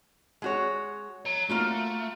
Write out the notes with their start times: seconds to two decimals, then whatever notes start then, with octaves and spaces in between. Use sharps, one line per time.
0.42 G#3 F#4 C#5
1.25 C#5 A#5
1.49 A3 A#3 F4 F#4